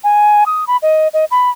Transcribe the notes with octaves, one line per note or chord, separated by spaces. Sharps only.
G#5
D#6
B5
D#5
D#5
B5